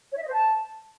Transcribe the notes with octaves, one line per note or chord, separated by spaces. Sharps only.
C#5
E5
D#5
C5
A5